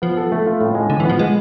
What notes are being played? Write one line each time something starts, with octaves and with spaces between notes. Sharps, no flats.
F3 B3
A4
A3
F4
A2
G#3
A2 D3
E3
F3 B3
B2 G#3